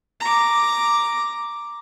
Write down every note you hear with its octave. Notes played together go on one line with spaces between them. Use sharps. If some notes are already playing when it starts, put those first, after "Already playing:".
A#5 D6